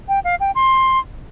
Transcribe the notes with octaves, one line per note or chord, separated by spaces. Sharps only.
G5
F5
G5
C6